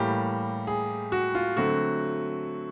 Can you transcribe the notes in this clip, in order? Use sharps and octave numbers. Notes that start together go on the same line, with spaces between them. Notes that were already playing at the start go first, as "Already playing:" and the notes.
Already playing: A2 E3 G3 A#3 G4
G#4
F#4
F4
D3 F#3 A3 C4 F#4